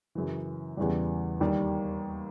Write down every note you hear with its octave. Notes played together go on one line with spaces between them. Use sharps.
F#2 C#3 E3
E2 C#3 E3 G3
D#2 D#3 G3